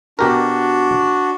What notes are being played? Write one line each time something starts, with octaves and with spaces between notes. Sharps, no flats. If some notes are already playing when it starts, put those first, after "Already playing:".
B2 D4 F#4 G4 A#4